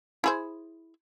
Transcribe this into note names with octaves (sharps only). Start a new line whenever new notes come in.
E4 G#4 C5